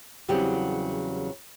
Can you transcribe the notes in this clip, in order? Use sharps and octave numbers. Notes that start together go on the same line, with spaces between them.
E2 C#3 F#3 G3 C4 G4